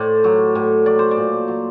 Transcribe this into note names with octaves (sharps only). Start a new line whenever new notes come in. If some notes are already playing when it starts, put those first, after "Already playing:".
Already playing: A2 C5 D5
F#3
A2
F#3 D5
C5
D5
A#2
F#3